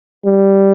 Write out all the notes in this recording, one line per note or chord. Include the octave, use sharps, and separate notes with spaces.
G3